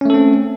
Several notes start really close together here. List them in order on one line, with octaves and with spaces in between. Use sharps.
C#4 A3 A4 C4